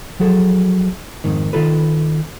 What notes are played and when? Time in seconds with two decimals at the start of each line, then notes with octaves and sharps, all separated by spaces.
0.20 F3 F#3 G#4 A4
1.24 F2 G#2 D#3
1.53 D#3 F4 A4 B4